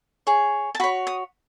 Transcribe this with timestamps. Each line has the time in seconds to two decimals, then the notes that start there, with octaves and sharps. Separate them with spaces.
0.27 G#4 C#5
0.75 A5
0.80 F#4 B5
0.84 C#5
1.07 D#6